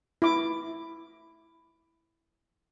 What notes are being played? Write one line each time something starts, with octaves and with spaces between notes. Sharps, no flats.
E4 D6